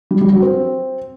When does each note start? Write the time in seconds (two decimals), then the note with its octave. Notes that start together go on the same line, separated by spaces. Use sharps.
0.11 G3
0.21 G3
0.32 F#3
0.42 C4